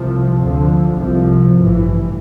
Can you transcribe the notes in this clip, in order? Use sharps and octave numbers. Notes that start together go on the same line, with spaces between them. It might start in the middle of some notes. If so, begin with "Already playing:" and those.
Already playing: C2 C3 F3
D2 D3 F3
C2 C3 F3
A1 G2 E3